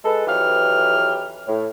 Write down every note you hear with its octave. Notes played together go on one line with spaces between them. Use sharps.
G#3 A4 B4
F2 E3 F#3 G4 B4 F6
A2